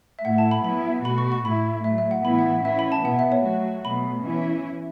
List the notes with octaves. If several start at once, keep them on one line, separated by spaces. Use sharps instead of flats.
E5
A2 A3 E4 F#5
A5
B5
F#3 B3 E4 B5
B2 A3 F#4 B5
C#6
C#6
A2 A3 E4 B5
A2 F#3 A3 E5
E5
F#5
A2 E3 B3 E4 B5
F#5
E3 C#4 E4 E5
B5
A5
B2 B3 E4 F#5
E5
C#5
F#3 A3 F#4
B2 F#3 A3 B5
E3 C#4 E4